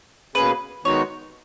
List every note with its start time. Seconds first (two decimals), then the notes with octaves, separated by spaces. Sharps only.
0.35 B2 A#3 C#4 G#4 B4
0.84 D#3 G#3 B3 D#4 F#4 C#5